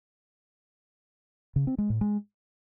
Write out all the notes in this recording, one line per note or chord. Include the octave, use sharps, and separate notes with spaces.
C#3
C4
G#3
A2
G#3